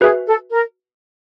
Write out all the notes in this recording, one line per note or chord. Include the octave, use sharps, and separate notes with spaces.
F#4 G#4 B4 E5 G#5
A4
A#4